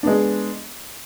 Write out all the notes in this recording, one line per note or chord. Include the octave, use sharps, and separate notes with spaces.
G#3 B3 D4